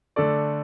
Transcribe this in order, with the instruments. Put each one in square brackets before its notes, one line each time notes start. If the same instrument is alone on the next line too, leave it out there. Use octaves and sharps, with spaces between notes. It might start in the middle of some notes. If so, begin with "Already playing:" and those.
[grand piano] D3 A3 D4 A4 D5